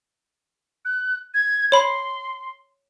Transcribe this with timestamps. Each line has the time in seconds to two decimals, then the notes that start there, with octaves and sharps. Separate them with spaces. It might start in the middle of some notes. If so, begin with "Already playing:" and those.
0.85 F#6
1.34 G#6
1.72 C#5 B5 C6